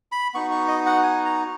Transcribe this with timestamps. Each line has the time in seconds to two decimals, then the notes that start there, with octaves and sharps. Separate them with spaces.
0.12 B5
0.34 B3 D#4 F#4 C#6
0.51 C#6
0.68 D#5
0.86 F#5
1.03 G#5
1.25 A#5